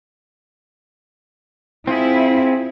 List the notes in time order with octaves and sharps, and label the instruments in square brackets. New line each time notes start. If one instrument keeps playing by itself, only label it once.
[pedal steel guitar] C4 F4 G#4 [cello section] E4